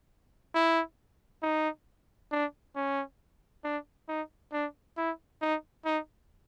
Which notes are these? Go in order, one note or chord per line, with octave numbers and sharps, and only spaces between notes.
E4
D#4
D4
C#4
D4
D#4
D4
E4
D#4
D#4